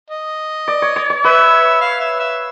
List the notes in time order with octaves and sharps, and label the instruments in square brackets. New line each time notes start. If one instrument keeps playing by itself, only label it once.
[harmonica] D#5
[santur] D5
C#5
C#5
C#5
[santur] B4 [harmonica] E5
[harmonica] F5
E5
E5